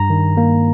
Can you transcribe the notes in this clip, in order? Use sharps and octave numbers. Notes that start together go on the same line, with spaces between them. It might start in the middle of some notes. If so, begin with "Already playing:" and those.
Already playing: G2 A#5
D#3
A#3